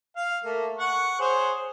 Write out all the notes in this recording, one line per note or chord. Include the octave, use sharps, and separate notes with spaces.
F5
A3 A#3
F#5 C#6
G#4 C5 C#5